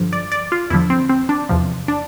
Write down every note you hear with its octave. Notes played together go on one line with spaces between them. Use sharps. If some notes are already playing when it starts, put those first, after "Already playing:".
Already playing: G2 D3 F3
D5
D5
F4
E2 D3 F3 E4
C4
C4
D4
E2 C3 F3
D4